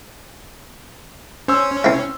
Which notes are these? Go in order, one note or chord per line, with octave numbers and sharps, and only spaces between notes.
C#4 C5 E6
C4 E4